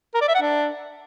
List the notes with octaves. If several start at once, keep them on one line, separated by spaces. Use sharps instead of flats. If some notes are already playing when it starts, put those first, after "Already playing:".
A#4
D5
E5
F#5
D4